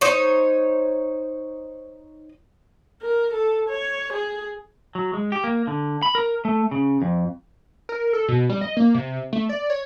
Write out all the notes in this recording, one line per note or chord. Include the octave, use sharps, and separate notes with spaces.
D#4 C5 C#5
A#4
A4
C#5
G#4
F#3
G#3
G4
A#3
D3
B5
A#4
A3
C#3
F2
A#4
A4
B2
G3
D#5
A#3
C3
A3
D5
C#5